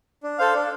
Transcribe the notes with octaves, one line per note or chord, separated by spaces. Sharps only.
D4
A4 C5 F5
D4